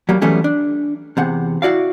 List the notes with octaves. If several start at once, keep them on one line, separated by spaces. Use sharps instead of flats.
F#3 G3 A#3
E3 F#3 G3 A3 B3 C#4
D4
E2 C3 F#5
E4 F#4 D5 F5